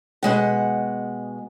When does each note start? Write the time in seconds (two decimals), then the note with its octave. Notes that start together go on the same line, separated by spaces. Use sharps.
0.23 B2 G#3 F#5